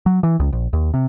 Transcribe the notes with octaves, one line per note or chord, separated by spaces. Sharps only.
F#3
E3
C#2
A#1
D#2
C3